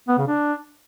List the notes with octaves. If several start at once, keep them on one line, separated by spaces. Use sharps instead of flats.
B3
C#3
D4